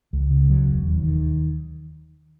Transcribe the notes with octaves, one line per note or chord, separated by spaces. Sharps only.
C#2
C#3
F#3
E1
D#2
D#3